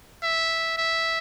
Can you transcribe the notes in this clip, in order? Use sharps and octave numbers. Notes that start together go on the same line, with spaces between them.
E5
E5